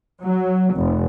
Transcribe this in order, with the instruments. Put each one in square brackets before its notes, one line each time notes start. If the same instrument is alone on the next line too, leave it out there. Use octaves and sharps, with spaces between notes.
[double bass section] F#3
F1